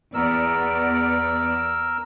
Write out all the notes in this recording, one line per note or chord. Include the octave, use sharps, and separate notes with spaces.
E2 B3 A#4 D5 E6